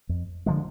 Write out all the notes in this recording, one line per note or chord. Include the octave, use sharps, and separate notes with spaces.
F2
D3 F3 G#3